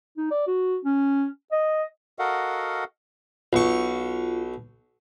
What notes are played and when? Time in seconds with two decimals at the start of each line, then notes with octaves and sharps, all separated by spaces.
0.17 D#4
0.31 D5
0.47 F#4
0.85 C#4
1.52 D#5
2.19 F#4 A4 A#4 D#5 F5 F#5
3.53 B1 F4 C#6